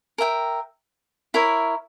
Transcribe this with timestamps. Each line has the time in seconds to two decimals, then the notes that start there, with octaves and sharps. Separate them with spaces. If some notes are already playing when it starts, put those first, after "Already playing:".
0.18 A#4 E5 G5
1.34 E4 A#4 C#5 E5